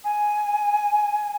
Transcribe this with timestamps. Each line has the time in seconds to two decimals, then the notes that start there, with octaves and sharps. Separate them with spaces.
0.04 G#5